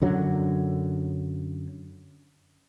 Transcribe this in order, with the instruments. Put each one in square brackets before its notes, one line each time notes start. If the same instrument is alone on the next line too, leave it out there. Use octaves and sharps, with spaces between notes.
[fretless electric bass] F#2 D3 F#3